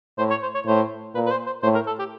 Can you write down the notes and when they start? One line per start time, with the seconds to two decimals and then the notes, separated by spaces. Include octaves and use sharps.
0.18 A2 C5
0.30 C#5
0.43 C5
0.55 C#5
0.67 A2 C5
1.15 A#2 B4
1.26 B4
1.31 C5
1.46 C5
1.63 A2 C5
1.75 A#4
1.87 A4
1.99 G4